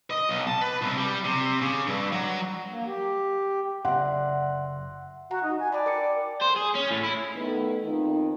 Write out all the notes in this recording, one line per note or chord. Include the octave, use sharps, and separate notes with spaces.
D#5
B1
A5
B4
C2
G3
C3
C#3
G2
F#3
A#3
G4
F#1 D3 E5 F#5 C6
F#4 F#5 A#5
D#4
G#5
D5 G5 A5 B5
A#4 D6 C#7
C5
G#4
C#4
A2
E4
D#3 A3 B3
F2 D#3